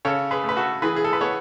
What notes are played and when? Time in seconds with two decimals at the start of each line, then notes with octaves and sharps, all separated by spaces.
0.05 C#3 A4 C#5
0.31 G#4 B4
0.43 A3
0.49 B4
0.57 F#4 A4
0.82 E3 G#4 B4
0.96 G#4
1.04 A4
1.13 B4
1.21 B3 A4 C#5